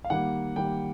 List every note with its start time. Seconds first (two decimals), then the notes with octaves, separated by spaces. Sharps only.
0.04 F5
0.10 D#3 G3 A#3 F#5
0.56 D#3 G3 A#3 G5